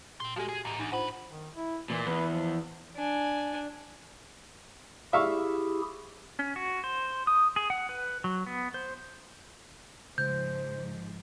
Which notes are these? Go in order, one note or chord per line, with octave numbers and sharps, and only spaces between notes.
A#2 G5 C6
F3 G#3 F#4 G4 A4
G#4
E2 A2 D#4
E2 D4 D#4
D#2 F4 B4 C5 F#5
D#3
E4
A#2 E3
E2 B4
F3
D4 G#5
E4 G4 G#4 E5 F5 C#6
C#4
F#4
C5
D#6
G#4
F#5
B4
F#3
B3
C5
G#2 C#3 F3 C5 G6